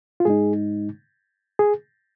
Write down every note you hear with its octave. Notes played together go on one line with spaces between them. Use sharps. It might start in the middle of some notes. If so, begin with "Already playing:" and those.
F4
G#2 G#3 D#4 G#4
G#4